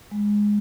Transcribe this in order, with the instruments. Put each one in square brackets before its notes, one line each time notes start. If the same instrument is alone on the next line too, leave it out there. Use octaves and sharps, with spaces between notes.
[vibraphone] G#3